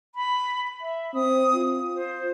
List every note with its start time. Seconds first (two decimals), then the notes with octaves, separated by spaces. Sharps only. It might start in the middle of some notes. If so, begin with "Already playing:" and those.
0.15 B5
0.81 E5
1.14 C4 D#6
1.56 F4
1.94 C5